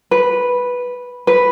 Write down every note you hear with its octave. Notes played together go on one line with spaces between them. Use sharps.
B4
B4